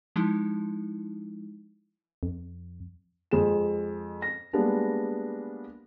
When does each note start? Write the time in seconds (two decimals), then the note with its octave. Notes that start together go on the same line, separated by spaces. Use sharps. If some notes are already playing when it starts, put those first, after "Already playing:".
0.16 F3 G#3 D#4 E4
2.23 F2
3.31 F2 G#3 G#4 E7
4.22 A#6
4.53 G3 G#3 A#3 B3 D4